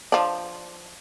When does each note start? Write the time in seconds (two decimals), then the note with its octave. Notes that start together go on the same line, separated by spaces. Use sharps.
0.12 F3 D4